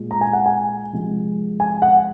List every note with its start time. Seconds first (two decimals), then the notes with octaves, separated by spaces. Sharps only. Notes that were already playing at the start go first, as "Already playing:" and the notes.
Already playing: A#2 G#3
0.11 A#5
0.21 G#5
0.33 F#5
0.46 G#5
0.93 C3 F3 G#3
1.60 G#5
1.82 F#5